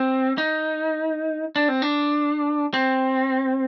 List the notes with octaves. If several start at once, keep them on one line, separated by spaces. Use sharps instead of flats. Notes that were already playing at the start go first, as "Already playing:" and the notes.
Already playing: C4
D#4
D4
C4
D4
C4